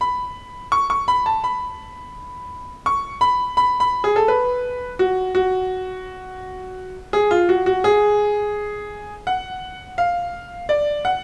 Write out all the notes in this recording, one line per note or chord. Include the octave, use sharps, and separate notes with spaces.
B5
C#6
C#6
B5
A5
B5
C#6
B5
B5
B5
G#4
A4
B4
F#4
F#4
G#4
F4
F#4
F#4
G#4
F#5
F5
D5
F#5